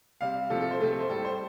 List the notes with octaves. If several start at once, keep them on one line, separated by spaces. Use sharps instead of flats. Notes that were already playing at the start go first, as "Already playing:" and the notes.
C3 G3 F5
C3 F3 A3 A4
A4
C5
C3 A3 A4
A4
C5
A2 G3 A4
C5